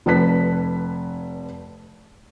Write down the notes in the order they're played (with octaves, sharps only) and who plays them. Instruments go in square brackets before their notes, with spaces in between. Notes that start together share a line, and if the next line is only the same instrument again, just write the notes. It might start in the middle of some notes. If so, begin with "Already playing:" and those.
[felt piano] F1 B4 A5 F#6 B6